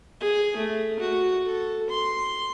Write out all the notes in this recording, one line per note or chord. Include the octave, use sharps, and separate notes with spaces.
G#4
A3
F#4
A4
C6